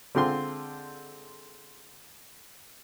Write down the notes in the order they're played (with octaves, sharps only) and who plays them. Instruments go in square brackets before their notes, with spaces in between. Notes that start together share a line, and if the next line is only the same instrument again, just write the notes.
[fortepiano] D3 G#3 C4 F4 G5 C6